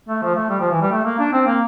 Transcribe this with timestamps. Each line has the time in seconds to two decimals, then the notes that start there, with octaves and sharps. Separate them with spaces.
0.09 A3
0.23 F3
0.36 A3
0.50 G3
0.61 F3
0.71 E3
0.82 G3
0.92 A3
1.05 A#3
1.19 D4
1.33 C4
1.47 A#3